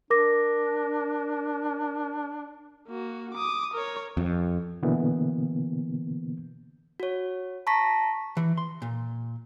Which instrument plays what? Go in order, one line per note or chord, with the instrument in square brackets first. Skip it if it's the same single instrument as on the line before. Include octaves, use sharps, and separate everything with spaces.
[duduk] D4 [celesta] A#4 D6 A#6
[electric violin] A#3 F#4
D6 D#6
A#4 C#5
[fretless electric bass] F2
[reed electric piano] B2 D3 E3 A#3 B3
[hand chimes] F#4 C#5
A5 A#5 C#6 A#6 B6
[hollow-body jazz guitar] E3
C6
A#2